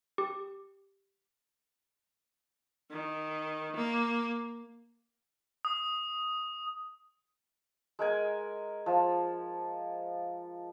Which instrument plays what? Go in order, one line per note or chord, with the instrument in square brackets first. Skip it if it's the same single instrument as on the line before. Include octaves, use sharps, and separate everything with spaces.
[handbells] G4
[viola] D#3
A#3
[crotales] D#6
[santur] G#3 A#4 G#5
F3